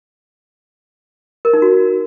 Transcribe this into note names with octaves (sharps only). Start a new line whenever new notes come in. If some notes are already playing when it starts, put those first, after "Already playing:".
A#4
D#4
F#4